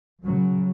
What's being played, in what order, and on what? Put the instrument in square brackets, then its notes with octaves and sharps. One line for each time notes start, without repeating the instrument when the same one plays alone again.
[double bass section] F#2 C#3 F#3